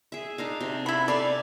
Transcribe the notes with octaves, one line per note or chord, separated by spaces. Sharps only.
G#4 E5
D4 D#4 F5
C3
E4 B5
A4 D5 F5 G#5